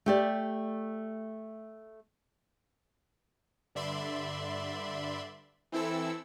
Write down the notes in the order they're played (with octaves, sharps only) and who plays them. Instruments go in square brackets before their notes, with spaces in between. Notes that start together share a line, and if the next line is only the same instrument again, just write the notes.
[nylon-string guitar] A3 G4 D5
[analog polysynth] G2 D3 D5 E5 B5 C6
E3 C4 E4 A4 E6